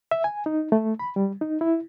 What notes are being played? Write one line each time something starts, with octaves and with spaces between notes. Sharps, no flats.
E5
G#5
D#4
A3
B5
G3
D#4
E4